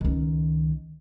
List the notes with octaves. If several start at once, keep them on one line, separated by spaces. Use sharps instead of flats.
C#2 D#3